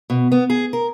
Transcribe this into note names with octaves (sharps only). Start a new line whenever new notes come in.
B2
B3
G#4
A#4